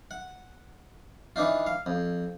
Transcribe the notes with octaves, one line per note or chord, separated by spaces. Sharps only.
F#5
E3 D4 D#4 F4
F5
F2